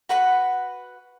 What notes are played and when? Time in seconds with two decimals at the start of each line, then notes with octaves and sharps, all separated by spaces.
0.09 F#4 B4 F#5 B5